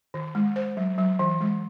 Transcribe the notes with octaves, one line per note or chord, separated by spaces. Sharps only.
D#3
G#3
C5
F#3
F#3
E3
G#3